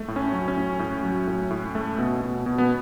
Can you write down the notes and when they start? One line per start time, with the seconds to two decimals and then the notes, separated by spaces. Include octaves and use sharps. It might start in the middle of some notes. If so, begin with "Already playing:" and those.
Already playing: A3
0.08 A2
0.16 C#4
0.32 F#3
0.48 C#4
0.57 A2
0.79 A2
1.03 F#3
1.27 A2
1.51 A2
1.75 A3
1.98 B2
2.21 B2
2.46 B2
2.58 B3